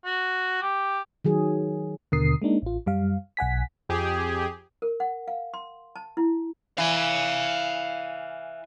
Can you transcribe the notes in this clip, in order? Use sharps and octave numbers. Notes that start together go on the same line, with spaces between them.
F#4
G4
D#3 F#3 G#4
D#2 B2 D3 A#4 D#6 C7
G#3 A#3 D4 D#4
A1 F4
F#2 G3 F5
B1 F#5 G#5 B6
F2 G4 G#4
A#4
F#5
F5
C6
A5
E4
E3 F5 G#5